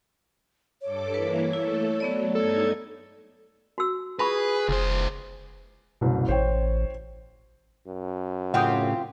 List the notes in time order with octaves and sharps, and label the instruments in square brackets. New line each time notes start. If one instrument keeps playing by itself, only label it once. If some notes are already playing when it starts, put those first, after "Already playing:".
[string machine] G2 A4 D6 [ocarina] C#5
[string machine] E3 A#3 E4 [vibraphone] B4
[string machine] A3 A4 [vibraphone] E4
[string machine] F#3 [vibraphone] A3 B3 D5
[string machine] G2 D#4 G#6 [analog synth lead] A4
[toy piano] F#4 E6
[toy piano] F4 B5 C#6 [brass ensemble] G#4 [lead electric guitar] B4
[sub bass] F1 [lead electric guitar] C#2 C5
[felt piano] F#1 C2 F#2 [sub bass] B2
[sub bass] A1 [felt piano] C5 C#5 G5
[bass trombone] F#2
[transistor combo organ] A2 C#3 [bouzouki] C4 F4 G4 [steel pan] F#5 G5 D#6